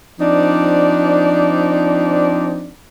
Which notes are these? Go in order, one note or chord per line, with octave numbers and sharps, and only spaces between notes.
F3 C4 D4 D#4 D5